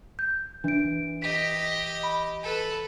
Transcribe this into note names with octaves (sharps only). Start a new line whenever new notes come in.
G6
E3 D4 D7
G4 D#5 B6
B5
A4 B4